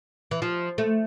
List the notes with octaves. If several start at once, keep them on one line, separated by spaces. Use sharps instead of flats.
E3
F3
A3